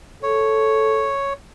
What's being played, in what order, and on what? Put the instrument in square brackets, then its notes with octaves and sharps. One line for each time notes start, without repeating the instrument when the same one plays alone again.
[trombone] A4 [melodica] C#5